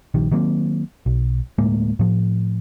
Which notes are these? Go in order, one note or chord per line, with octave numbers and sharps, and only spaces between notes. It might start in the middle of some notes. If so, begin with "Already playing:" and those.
A#1 D#3 G3
D#3 F#3 A#3 C4
B1
D1 A2 G#3 A#3
A2 F3